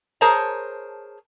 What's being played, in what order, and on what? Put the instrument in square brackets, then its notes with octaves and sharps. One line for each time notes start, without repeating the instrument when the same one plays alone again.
[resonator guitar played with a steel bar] G#4 A#4 C5 C#5 A5 A#5